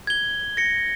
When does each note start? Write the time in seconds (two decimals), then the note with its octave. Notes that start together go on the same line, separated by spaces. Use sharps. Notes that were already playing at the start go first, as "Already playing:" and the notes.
0.07 G#6 G7
0.57 A#6 C#7